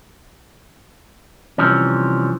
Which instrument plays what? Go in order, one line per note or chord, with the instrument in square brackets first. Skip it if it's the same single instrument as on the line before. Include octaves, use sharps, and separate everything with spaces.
[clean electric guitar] C3 E3 F3 G3 C#4